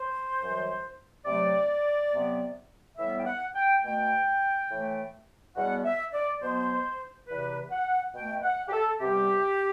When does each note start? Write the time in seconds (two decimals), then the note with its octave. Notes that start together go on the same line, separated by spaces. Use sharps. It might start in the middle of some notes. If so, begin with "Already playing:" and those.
Already playing: C5
0.40 F#2 E3 G3
1.25 C3 F#3 A3 D5
2.11 C3 F#3 B3
2.98 A2 E3 G3 B3 E5
3.18 G5
3.26 F#5
3.55 G5
3.84 B2 A3 G5
4.70 A2 E3 A3
5.56 E2 B2 G3 B3 F#5
5.85 E5
6.13 D5
6.42 B2 F#3 B3 C5
7.28 E2 C3 E3 B4
7.71 F#5
8.14 B2 A3 G5
8.43 F#5
8.68 G4
8.72 A4
9.01 C3 G3 B3 G4